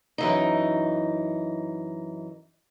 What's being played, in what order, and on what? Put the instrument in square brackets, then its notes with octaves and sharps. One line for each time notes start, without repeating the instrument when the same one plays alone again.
[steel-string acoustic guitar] F#2 E3 D#4